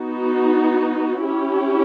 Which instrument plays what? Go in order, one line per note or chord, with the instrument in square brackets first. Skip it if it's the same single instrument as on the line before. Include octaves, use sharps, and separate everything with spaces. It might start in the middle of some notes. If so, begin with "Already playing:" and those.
Already playing: [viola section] B3 D#4 F#4
C#4 E4 G4